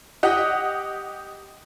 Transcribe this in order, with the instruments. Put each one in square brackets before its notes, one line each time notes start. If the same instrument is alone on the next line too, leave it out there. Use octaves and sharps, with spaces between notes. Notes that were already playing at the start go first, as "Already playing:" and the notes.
[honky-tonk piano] G4 D#5 F#5